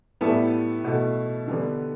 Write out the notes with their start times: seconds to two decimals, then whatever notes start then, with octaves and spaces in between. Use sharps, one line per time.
0.21 A2 G3 B3 E4 A4
0.84 B2 A3
1.48 D3 G3 B3